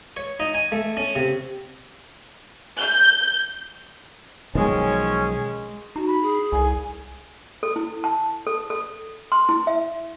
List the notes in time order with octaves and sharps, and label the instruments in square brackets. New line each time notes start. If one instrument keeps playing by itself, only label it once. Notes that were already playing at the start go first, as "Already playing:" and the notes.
[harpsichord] C#5
D#4
G#5
A3
C#4
C3
[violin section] G6
[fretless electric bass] B1 D#3 F3 [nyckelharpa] G#3 [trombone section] C#4
[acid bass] D#4 [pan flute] F#4
[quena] B5
[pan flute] G#4
[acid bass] C2 [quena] G#5
[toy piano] A4
E4
A5
A4
A4
C6
E4
E5